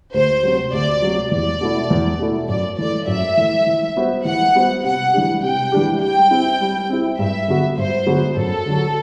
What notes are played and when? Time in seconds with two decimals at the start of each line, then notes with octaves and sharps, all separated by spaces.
0.14 D2 C5
0.43 C3 F#3
0.72 D2 D5
1.02 C3 F#3
1.31 E2 D5
1.61 B2 A3 E4
1.90 E2
2.19 B2 A3 E4
2.49 F#2 D5
2.78 E3 A3 D5
3.07 F#2 E5
3.37 E3 A3
3.66 E3
3.96 G3 B3 F#4 C5
4.25 E3 F#5
4.54 G3 B3 F#4 C5
4.84 C3 F#5
5.13 E3 G3 D4 G4
5.43 C3 G5
5.72 E3 G3 D4 G4
6.01 G3 G5
6.31 C4 E4
6.60 G3
6.90 C4 E4
7.18 G2 E5
7.48 D3 F#3 B3 F#4
7.77 G2 C5
8.06 D3 F#3 B3 F#4
8.36 F#2 A4
8.66 D3 F#3